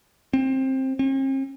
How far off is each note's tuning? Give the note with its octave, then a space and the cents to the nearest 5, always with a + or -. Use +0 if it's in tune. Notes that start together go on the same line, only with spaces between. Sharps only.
C4 +15
C4 +45